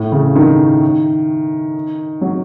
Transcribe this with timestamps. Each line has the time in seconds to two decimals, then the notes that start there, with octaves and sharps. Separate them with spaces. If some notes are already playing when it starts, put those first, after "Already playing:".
Already playing: A2
0.12 C#3
0.35 D#3
2.21 F#3